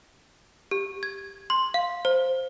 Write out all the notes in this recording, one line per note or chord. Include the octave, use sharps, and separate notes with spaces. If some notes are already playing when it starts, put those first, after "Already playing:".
G4
G#6
C6
F5
C5